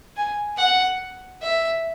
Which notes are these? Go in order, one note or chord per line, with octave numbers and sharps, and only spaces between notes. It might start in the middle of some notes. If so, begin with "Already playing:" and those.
G#5
F#5
E5